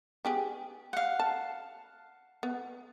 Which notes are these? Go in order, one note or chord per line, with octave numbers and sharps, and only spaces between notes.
B3 G4 G#4
F5 F#5
A5
B3